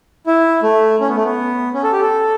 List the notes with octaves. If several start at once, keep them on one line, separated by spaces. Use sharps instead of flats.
E4
A3
C#4
B3
A3
B3
C#4
A4
G4
A4